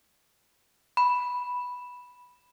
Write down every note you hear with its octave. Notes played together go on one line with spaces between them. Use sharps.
B5